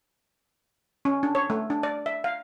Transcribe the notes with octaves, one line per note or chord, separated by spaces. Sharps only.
C#4
D4
C#5
A3
D4
D5
E5
F5